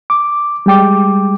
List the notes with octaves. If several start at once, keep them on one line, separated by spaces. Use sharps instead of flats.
D6
G3 G#3 G5 D6